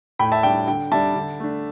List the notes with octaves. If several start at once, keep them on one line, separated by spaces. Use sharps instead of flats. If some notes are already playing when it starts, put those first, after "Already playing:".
A2 G5 B5
E5 A5
G3 D4 G5
D3 G5
G3 D4 E5 A5
D3
A3 D4